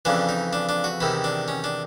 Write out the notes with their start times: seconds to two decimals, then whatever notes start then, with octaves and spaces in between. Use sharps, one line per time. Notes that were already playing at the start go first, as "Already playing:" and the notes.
0.05 F2 C#3 E3 D4
0.29 D#4
0.53 D4
0.69 D4
0.84 F#4
1.01 E2 C3 D#3 E4
1.24 D4
1.48 C#4
1.64 D4